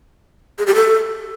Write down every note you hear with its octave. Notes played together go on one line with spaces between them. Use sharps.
G#4
G4
A4